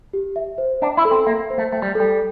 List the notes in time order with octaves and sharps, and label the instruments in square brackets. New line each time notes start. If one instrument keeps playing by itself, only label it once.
[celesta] G4
E5
C5
[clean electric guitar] D4 [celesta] G5
[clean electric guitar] E4
[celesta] A4
[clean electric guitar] C4
[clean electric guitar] A#3 [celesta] E5
[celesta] C5
[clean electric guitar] A3
[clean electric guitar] A3 [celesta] G5
[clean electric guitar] G3
[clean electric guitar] G3 [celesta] A4